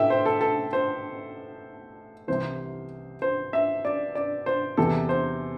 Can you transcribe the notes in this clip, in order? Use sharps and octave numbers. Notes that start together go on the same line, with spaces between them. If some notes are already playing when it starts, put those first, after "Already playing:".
Already playing: A2 A3 E4 E5 G5
C5
A4
A4
C5
C2 C3 E3 C5
C5
E5
D5
D5
C5
E2 C3 E3 A4
C5